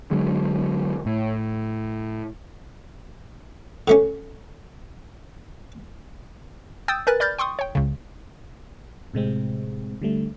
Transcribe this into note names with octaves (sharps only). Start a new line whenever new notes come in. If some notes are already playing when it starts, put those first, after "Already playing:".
D3 F#3 G#3
A2
D3 A3 C#4
G5 D#6 E6 G6 A6
A#4 B4 G#5 F#6 A6
D5 B5 F6 G6 A6
G5 C6 C#6 D#6
C#5 G5
C#2 C#3
A2 C3 G#3 C4
D3 G3 A3